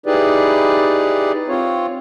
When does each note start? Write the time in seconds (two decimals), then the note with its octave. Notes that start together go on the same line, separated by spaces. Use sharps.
0.06 D#4 E4 G4 G#4 B4 D5
1.48 C4 F4 C#5